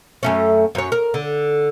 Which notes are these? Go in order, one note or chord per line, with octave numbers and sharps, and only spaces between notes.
F#2 A3 C#4
F#2 C#5
A#4
D3